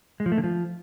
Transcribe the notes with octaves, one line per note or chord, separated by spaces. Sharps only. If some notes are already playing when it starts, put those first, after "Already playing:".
G#3
F3
A3
D3
F3